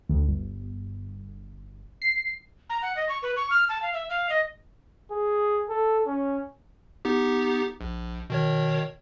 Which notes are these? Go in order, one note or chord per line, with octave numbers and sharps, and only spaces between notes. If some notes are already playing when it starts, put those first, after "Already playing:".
D2
G1
C7
A#5
F#5
D#5
C#6
B4
C#6
F6
A5
F5
E5
F5
D#5
G#4
A4
C#4
B3 D#4 G4
A#1
B2 D#3 C#5